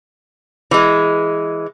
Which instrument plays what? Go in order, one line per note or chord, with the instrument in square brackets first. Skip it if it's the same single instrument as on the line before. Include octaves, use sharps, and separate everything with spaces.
[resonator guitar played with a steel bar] E3 G#3